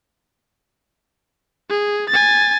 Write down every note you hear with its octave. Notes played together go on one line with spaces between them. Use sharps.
G#4
G#5 A6